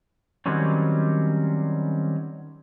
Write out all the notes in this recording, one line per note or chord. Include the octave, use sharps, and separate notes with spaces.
D#3 F#3 G3 C4 C#4